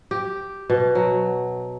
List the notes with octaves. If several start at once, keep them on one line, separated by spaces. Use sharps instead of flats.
G4
B2
F#3